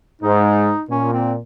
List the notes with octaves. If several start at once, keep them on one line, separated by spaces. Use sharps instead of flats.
G#2 D#4
A#2 C#4
C4